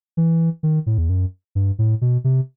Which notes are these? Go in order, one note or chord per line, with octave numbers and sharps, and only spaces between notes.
E3
D#3
A2
E2
F#2
G2
A2
B2
C3